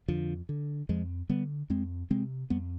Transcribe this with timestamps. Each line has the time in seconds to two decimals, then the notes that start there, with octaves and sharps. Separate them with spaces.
0.08 F2 D3 F3
0.49 D3
0.89 F2 F3 G#3
1.29 D3 G3 B3
1.70 F2 G#3 C4
2.10 C3 G#3 C4
2.50 F2 G3 B3